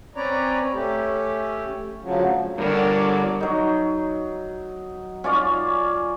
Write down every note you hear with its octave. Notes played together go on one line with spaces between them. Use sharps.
C4 C#4 B4 C#5 D5 A#5
A3 C#4 G4
D2 C#3 F3 F#3
G2 D3 A#4 C#5 D5
F#3 D#4
C#4 F4 D5 F5